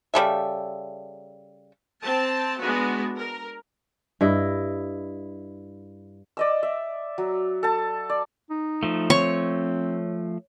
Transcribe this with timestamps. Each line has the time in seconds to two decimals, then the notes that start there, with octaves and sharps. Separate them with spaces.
0.14 C#3 G3 A4 E5
2.02 C4 A5
2.61 G#3 B3 D4 F#4
3.18 A#4
4.21 G2 E4 D#5
6.37 D5 D#5 E6
6.63 E5
7.18 F#3
7.63 A4 A5
8.10 D5
8.50 D#4
8.83 F3 A3
9.10 C4 C#5 C#6